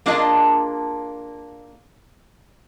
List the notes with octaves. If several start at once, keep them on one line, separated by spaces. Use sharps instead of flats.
A#3 D4 F4 G#4 D#5 A5